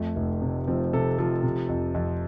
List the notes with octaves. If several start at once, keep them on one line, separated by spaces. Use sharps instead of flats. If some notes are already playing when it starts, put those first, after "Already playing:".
Already playing: F2 A3
F1
C3
F3 C4
C3 A4
F3 A4
C3
F2
F2